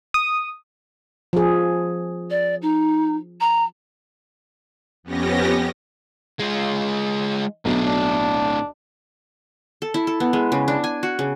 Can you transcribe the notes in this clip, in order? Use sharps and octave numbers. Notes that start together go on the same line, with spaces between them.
D#6
F3 G#4
D5
D#4
A#5
F2 B3 C#4 G4 A#6
G#3 F4
B1 A2 D3
D4
A4
E4
A4
B3
G#3
C#3
D4
G#5
F#4
C#3